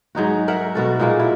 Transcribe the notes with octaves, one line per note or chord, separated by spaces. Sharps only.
G#2 F#3 D#4 F#4
A#4 E5 F#5
B2 F#4 A4
A#2 G#3 A#3
E4